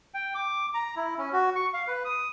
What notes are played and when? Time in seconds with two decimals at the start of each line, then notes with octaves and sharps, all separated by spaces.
0.14 G5
0.35 D6
0.74 A#5
0.96 E4
1.18 C#4
1.33 F#4
1.55 C#6
1.74 F5
1.88 B4
2.05 D#6